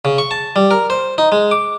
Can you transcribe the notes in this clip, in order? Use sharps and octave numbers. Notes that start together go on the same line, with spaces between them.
C#3
C#6
A5
G3
A#4
C5
D#4
G#3
D6